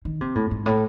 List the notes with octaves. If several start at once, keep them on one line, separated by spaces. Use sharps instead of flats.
D#3
C3
A2
G#2
A2